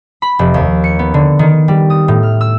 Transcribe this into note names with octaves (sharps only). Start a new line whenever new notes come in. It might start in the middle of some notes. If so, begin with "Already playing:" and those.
B5
F1
D#2
C#7
B3
D3
D#3
G3
D#6
A2
F6
E6